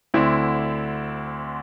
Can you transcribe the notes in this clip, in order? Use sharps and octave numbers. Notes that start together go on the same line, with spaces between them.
D2 D3 C4 E4